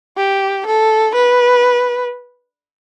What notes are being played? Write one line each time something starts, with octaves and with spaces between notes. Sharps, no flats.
G4
A4
B4